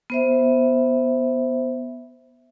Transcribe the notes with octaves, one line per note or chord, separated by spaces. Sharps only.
B3 C5 E5